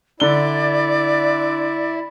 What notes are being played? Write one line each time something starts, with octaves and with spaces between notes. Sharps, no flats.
D3 E4 D5 G7